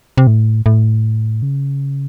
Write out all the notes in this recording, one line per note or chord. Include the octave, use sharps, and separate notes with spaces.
C3
A2
A2
C#3